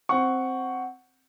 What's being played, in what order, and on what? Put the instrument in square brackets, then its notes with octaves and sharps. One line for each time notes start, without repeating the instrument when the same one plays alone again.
[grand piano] C4 F#5 C#6